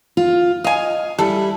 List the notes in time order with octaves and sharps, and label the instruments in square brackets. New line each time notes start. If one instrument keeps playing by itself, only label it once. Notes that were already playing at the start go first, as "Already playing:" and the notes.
[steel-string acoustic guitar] F4
[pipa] D#5 G#5 [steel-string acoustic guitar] F5
[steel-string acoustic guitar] G3 E4 [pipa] A4